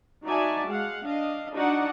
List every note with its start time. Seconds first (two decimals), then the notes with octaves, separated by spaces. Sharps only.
0.24 D#4 F#4 D5 E5 G#5 A5
0.68 G#3 F5 F#5
1.05 D4 D#5 F5
1.53 D4 D#4 F#4 D5 F#5